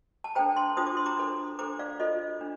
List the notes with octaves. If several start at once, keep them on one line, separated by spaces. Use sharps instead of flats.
A5
D4 A4 C5 G5 A#5
A5 C6
D4 F4 C5 D#6
D6
C6
A#5 D6
D4 A4 C5
D4 A4 C5 A#5 D6
D5 F5
F4 A4 C5 D#5
D4